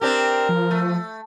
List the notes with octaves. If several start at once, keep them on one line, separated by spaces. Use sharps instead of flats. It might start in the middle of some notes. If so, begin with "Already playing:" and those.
C4 D4 G4 A#4
F3
A3